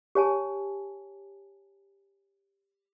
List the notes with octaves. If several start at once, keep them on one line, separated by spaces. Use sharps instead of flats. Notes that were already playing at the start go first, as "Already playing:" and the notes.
G4 C#5 G#5 A5